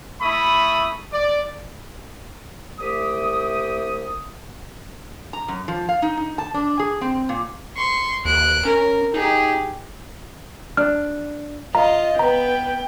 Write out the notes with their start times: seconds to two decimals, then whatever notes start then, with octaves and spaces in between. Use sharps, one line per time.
0.22 A3 E4 B5 C#6 D#6
1.13 D5
2.79 C2 A3 G4 D#6
5.33 A#5
5.48 F#2
5.68 F3
5.89 F5
6.02 D#4
6.17 D#4
6.38 A5
6.54 D4
6.79 G#4
7.01 C4
7.29 A#2
7.76 C6 C#6
8.25 D#2 F#6 D7
8.65 C#4 A#4
9.14 D#4 G4 G#4
10.77 D4 F6
11.75 F4 D#5 F5 A#5
12.19 B3 B4 G5 A#5